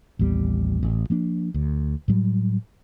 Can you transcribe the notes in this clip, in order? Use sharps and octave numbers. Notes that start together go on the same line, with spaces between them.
A1 D#2 G3 B3
A1
F3 A#3 D4
D2
A2 F#3 G3